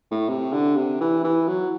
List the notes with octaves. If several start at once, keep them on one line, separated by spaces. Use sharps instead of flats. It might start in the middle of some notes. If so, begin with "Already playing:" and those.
A2
C3
D3
C3
E3
E3
F#3